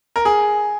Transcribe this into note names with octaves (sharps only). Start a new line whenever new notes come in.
A#4
G#4